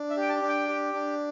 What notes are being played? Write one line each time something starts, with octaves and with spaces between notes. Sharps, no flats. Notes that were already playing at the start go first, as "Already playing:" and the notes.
Already playing: D4
E5
G4 G5
A5
D4
G5
G4
D4